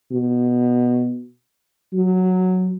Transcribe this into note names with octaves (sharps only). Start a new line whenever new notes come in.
B2
F#3